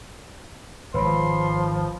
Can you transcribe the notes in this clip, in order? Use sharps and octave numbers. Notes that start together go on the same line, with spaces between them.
G#1 G#2 F3 B4 C#5 B5 C6